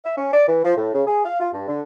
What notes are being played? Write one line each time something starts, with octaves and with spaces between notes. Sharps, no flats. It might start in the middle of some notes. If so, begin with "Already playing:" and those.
E5
C#4
D5
E3
F3
A2
C#3
G#4
F5
F4
G2
D3